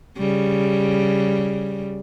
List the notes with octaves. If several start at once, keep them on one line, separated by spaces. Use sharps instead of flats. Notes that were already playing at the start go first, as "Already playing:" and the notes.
C#3 G3